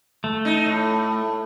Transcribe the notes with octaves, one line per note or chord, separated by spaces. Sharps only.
A3
D#4
A2